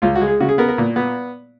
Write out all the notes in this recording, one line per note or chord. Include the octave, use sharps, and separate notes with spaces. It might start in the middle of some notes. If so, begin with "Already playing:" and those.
C#2 F4
F#4
G#3
G#4
C#3 F#4
G#4
B3 A#4
A#4
A#2
B3